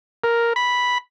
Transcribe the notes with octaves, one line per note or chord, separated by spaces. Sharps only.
A#4
B5